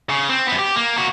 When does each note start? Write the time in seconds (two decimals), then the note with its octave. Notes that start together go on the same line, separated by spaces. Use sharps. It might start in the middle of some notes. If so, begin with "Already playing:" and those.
0.10 C#3
0.30 C4
0.47 F#2 B3
0.59 G4
0.76 A#3
0.97 A#3 F#4